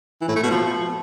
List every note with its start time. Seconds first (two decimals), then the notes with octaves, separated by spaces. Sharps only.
0.21 E3
0.29 A2
0.36 A3
0.43 B2
0.51 F3